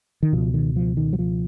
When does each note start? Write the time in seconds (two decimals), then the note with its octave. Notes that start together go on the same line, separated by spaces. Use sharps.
0.23 D#3
0.33 C#2 B2 F3
0.54 D#3
0.76 F3
0.97 D#3
1.13 F#3
1.19 F3